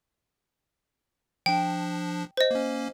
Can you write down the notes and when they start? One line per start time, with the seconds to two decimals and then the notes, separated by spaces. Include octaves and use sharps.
1.46 F3 D4 G5
2.37 C5 D#5
2.51 A#3 C#4